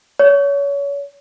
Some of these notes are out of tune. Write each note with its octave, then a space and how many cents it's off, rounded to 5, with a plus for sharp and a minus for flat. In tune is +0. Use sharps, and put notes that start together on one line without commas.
C#5 +30